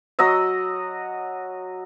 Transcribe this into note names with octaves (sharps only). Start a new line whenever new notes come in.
F#3 D#5 F#5 E6